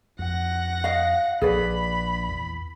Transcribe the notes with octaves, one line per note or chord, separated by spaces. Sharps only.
F2 F#5 A#6
D#5 F5
A#1 G#4 B4 D5 B5
E2